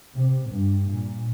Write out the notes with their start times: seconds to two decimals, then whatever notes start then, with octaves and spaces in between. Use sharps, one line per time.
0.16 C3
0.50 G2
0.85 A#2